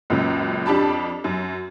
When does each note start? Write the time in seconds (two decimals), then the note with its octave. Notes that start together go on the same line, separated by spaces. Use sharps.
0.10 C#2 F#2 A#2 C#3
0.66 F2 D4 G4 A5 B5
1.24 F#2